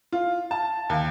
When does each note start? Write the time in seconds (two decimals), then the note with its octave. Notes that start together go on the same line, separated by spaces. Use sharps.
0.12 F4
0.51 A5
0.90 D#2